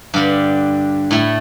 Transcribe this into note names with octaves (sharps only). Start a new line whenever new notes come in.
G2 D3 G3
A2 A3 E4